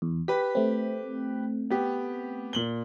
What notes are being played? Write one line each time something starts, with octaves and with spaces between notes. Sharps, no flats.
E2
G4 B4 B6
A3 C4
B3 G4
A#2 F#7 G7